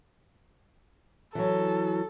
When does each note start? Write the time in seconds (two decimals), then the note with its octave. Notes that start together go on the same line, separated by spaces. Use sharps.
1.35 E3 F#3 A4